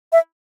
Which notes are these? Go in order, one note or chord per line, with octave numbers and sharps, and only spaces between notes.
E5